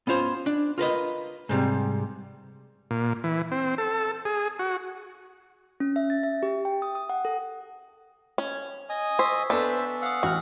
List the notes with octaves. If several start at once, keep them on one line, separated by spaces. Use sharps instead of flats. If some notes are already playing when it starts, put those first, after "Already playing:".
B3 C#4 F4 C5
D4
F4 A#4 B4 D#5
G#2 C3 G3
A#2
E3
C4
A4
G#4
F#4
C#4
E5
A6
E5
G4
G5
D#6
D#6
F#5
A4
C#4
D#5 G#5 D#6
C5 C#6 E6 B6
B3 D4 A4 C5 E5 G#5
F5 F#5 D#6 E6
A1 F#4 F6